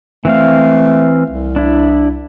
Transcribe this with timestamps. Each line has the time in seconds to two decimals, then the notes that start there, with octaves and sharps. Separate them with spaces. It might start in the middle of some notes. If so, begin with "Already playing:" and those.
0.25 E3 A3 C4 F5
1.30 C2
1.56 D4 E4